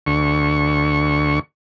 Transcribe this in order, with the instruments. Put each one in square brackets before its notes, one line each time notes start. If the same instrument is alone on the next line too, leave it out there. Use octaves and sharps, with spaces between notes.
[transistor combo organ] D2 C#6